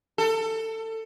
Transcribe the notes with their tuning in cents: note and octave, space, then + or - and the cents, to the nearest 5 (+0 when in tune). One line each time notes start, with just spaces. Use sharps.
A4 +20